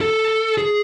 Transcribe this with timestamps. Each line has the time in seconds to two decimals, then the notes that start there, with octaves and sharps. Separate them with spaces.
0.01 A4
0.58 G#4